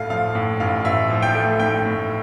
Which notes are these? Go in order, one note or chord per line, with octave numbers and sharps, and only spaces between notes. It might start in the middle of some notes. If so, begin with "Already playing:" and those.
Already playing: A1 A2 A3 F5
F3 F5
A2
A1 F5
A1 E5
F3
G5
A3
A2 G5
A2